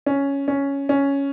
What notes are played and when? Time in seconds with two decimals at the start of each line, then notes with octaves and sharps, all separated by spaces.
0.06 C#4
0.48 C#4
0.89 C#4